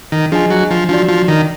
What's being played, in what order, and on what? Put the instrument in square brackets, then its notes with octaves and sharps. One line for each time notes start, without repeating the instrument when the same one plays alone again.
[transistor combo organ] D#3
[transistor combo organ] F3 [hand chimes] D4 G#4 D#5 G#5
[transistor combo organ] F#3
F3
[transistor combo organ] F3 [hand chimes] D4 F#4 D5
[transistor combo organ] F3
D#3